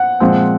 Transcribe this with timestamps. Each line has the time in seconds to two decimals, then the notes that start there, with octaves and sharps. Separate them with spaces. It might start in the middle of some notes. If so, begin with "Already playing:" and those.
Already playing: F#5
0.20 A#2 F3 G#3 C4